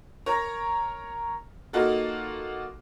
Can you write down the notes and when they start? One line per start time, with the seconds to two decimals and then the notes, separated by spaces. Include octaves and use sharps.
0.26 A#4 C#5 A#5
1.73 A#3 D#4 F4 F#4 A4